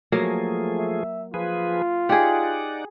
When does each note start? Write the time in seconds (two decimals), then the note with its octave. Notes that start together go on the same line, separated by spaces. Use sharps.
0.12 F3 F#3 A3 A#3 G#4
0.80 E5
1.34 F3 F4 G#4 B4
2.09 D#4 G4 G#4 D5 F#5